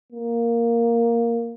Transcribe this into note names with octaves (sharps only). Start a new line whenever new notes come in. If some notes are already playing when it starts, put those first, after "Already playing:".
A#3